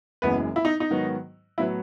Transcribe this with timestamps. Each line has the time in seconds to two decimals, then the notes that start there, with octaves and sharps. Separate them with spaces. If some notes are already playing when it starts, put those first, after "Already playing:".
0.22 F#1 F#2 E3 G#3 B3 B4
0.56 E4
0.65 D#4
0.80 D#4
0.90 G#2 D#3 F#3 B3 F#4
1.58 A2 F#3 B3 E4 F#4 B4